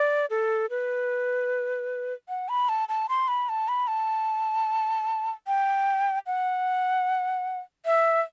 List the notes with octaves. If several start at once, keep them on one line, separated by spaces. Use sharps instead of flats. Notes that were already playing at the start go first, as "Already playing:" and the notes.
Already playing: D5
A4
B4
F#5
B5
A5
A5
C6
B5
A5
B5
A5
G5
F#5
E5